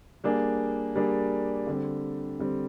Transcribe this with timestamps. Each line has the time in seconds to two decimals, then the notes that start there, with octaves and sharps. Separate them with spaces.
0.24 G3 A#3 D4 G#4
0.95 G3 A#3 D4 G#4
1.67 D3 G3 C4
2.39 D3 G3 C4